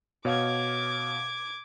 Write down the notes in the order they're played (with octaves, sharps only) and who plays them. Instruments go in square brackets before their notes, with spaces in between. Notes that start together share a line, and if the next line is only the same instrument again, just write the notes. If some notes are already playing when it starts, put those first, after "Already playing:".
[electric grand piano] B2 C#5 F5 [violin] D6 G#6